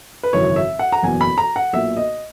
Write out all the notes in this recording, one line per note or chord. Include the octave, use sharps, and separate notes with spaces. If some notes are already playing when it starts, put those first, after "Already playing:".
B4
G#1 F#2 C#3 E3 C#5
E5
F#5
A#5
F#1 E2 B2 G#5
B5
A#5
F#5
B1 A#2 E5
D#5